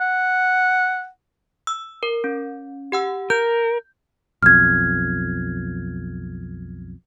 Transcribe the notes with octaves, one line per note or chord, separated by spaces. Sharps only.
F#5
E6
A#4
C#4
G4 F#5 E6
A#4 G6
B1 F2 F6 G#6